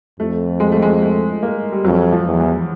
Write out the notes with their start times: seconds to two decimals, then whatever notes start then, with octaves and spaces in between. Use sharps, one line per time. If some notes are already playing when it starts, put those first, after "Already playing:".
0.20 F2 A3
0.60 G#3
0.72 A3
0.82 G#3
1.02 A3
1.43 A#3
1.72 G3
1.84 F2 F#3
2.13 F3
2.26 E2
2.40 E3